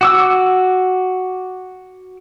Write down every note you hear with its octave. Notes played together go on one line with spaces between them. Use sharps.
F#4 D6 E6